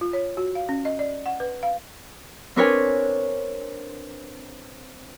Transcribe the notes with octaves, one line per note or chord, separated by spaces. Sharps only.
F4
C#5
F#4
F5
C#4
D#5
D5
F#5
B4
F5
C4 D4 A#4 B4 C#5 G#5